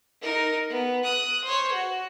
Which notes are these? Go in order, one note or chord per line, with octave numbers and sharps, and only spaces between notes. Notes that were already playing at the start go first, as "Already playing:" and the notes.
D#4 A#4
B3
D#6 F#6
C5 C#5
F#4